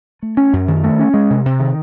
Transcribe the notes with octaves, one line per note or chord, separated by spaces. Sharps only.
A3
C#4
F#2
D#3
A3
C#4
G#3
C3
C3
D#3